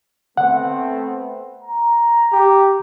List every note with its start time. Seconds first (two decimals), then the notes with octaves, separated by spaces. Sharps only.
0.37 A3 B3 C4 F#5
1.61 A#5
2.32 G4